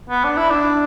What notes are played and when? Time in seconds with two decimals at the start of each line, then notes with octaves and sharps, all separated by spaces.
0.10 B3
0.24 D4
0.37 E4
0.50 D4